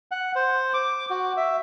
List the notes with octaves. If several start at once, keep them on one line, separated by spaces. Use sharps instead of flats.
F#5
C5
D6
F#4
E5